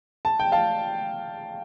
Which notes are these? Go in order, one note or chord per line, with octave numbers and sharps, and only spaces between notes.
A5
G5
F5 A5